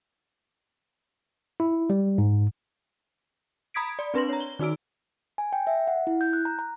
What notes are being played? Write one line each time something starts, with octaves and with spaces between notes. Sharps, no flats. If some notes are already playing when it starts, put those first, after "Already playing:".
E4
G3
G#2
A#5 B5 D#6 G#6 B6 D7
D5
C4 D4 B4 C6 A#6 F#7
C#5 A#5
G7
D#3 D#4 F#4 E6 D7
G#5
G5
E5
F#5
E4
G6
F#6
A#5
A#5